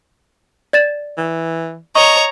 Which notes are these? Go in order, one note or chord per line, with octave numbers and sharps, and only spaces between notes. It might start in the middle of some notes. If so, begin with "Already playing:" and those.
D5 A6 E7
E3
C#5 D#5 A#5 C#6